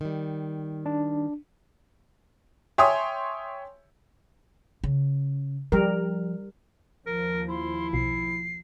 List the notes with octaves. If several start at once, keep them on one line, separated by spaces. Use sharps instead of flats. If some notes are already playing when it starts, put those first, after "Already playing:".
D#3 G3
D4
C#5 E5 G5 G#5 C6 D#6
C#3
F3 G3 A#4
D#2 F3 A#4
E4 C6
B1 B2 C7